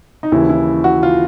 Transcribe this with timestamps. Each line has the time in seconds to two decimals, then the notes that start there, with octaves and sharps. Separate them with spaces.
0.23 D#4
0.32 D#2 C#3 E3 E4
0.49 E4
0.84 F#4
1.03 F4